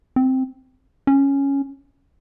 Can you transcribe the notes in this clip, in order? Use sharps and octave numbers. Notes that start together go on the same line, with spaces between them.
C4
C#4